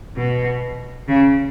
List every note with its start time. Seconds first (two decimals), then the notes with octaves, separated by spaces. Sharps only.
0.16 B2
1.08 C#3